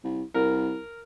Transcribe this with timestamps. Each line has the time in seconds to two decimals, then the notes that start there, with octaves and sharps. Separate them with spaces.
0.04 C2
0.34 C2 A#4